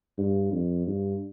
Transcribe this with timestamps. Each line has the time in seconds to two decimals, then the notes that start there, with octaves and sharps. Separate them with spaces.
0.18 G2
0.52 F2
0.87 G2